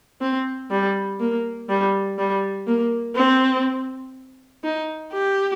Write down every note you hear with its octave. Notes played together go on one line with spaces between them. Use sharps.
C4
G3
A#3
G3
G3
A#3
C4
D#4
G4